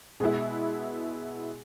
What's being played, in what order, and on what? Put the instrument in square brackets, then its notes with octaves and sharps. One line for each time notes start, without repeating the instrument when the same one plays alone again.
[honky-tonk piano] B2 G#3 B3 E4 [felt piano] G#4